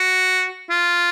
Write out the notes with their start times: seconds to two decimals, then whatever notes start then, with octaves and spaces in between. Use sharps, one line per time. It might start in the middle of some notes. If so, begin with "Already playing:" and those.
Already playing: F#4
0.70 F4